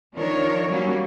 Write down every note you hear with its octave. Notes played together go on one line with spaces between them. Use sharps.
D#3 F3 D4 A#4 C#5
F#3 G3 A#3 C#4